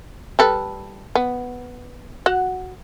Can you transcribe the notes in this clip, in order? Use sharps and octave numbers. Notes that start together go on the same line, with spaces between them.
G3 A4 B4
B3
F#4 F#5